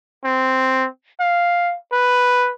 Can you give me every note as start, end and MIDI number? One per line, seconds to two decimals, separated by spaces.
0.25 0.88 60
1.20 1.76 77
1.92 2.52 71